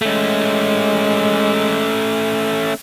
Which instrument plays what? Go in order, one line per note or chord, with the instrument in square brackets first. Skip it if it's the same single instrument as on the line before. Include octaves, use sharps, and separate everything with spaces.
[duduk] G#3 [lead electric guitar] A3 C#4